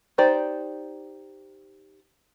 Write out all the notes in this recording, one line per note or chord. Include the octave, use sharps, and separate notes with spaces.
D#4 G4 C5 D5